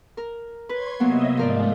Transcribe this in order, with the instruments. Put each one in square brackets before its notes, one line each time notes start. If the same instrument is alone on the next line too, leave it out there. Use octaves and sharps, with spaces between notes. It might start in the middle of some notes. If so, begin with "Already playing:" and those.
[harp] A#4
[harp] B4 [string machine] C#5 C6 G#6
[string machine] C3 D#5 E5 [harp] F#3 A#3 B3
[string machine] G#2 G#3 A3 [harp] F3 A#4 D5